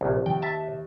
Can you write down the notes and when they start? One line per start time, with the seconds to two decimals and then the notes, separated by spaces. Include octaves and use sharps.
0.01 A#1 C3
0.26 D#2 G5
0.42 E5 A5